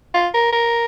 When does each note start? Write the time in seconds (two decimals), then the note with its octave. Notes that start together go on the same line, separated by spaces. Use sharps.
0.14 F4
0.34 A#4
0.52 A#4